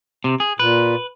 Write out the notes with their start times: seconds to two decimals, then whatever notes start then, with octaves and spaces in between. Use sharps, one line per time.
0.24 C3
0.40 G#4
0.59 A#2 B4